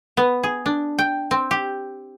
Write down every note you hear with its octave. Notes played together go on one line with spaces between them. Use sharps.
B3
G#4
D4
G5
C4
G4